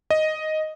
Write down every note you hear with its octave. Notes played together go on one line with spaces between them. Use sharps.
D#5